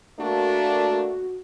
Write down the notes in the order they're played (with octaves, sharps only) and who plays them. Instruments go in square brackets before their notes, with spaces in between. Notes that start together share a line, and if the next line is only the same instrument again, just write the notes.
[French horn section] A3 A#3 D4 [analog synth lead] F#4